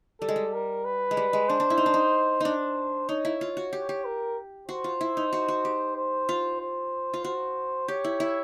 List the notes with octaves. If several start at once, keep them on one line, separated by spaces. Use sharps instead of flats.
G3 A4
G#3
G3
A#4
B4
G#3
G3
G#3
D4 C5
D4
E4
D#4
D4
D#4
D4 D#4 C5
D#4 C#5
E4
F4
F#4
G4
G4
A#4
F#4 C5
F4
E4
D#4
F#4
F#4
G4
C5
F4
C5
F4
F#4 C5
G4 C#5
E4
E4